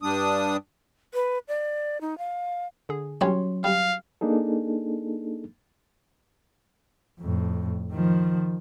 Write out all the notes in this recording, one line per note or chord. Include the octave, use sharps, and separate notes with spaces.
G2 G3 D4 D#6
B4
D5
D#4
F5
D3 G#4
A1 F#3 G3 C#4 D4 C#5 C6
G3 F5
A#3 D4 D#4 G#4 A4
F2 A2
D#3 F3